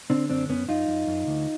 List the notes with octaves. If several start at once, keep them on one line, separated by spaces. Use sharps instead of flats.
D3 C4 D4
F#2 C4 D4
F#2 B3 C#4
F#2 D#4 F4
F#2
F#2
D2